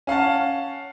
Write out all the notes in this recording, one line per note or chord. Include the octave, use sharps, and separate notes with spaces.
C#4 F5 F#5 A5